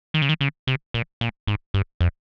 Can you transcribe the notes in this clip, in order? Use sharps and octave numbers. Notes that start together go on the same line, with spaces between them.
D#3
C#3
D#3
C#3
C3
A#2
A#2
G#2
G2
F2